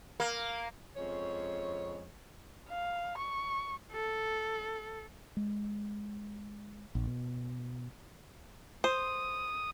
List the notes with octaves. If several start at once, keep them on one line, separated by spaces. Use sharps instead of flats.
A#3
F2 G#3 C#4 C#5
F5
C#6
A4
G#3
A#1
B2
C5 D#6